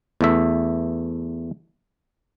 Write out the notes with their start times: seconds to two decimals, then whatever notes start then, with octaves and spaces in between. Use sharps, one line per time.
0.21 E2 A3 E5